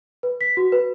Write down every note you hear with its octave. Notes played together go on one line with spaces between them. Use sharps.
B4
B6
F#4
B4